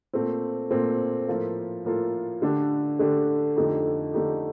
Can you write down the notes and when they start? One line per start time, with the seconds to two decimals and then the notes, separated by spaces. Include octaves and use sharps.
0.13 A#2 A3 C4
0.71 A#2 A3 C4
1.28 A2 F3 A#3 F4 A4
1.85 A2 F3 A#3 F4 A4
2.42 D3 A3 D4 G4
2.99 D3 A3 D4 G4
3.57 F2 D3 A3 D#4 G4
4.14 F2 D3 A3 D#4 G4